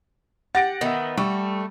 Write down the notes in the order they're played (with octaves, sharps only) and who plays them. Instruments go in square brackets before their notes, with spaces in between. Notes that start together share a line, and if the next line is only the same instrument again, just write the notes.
[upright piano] G4 [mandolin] F#5 [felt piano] A6 A#6 D7
[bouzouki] D#3 B3 [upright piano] D#5 E5
[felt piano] G3 [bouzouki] A3 [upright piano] C#6